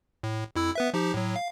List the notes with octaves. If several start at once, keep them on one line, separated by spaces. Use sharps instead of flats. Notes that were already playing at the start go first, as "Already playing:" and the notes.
A2
F2 E4 E6
B3 B4 E5
F3 D#4 G4
A2 F#3
F5